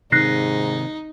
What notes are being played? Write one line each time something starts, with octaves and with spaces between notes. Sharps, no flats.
G#2 C3 D#3 D#4 F#6 A#6 C7